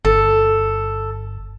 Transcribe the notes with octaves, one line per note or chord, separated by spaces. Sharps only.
G1 A4